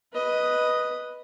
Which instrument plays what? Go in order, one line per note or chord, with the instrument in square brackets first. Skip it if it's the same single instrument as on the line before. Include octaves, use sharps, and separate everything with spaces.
[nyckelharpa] B4 D#5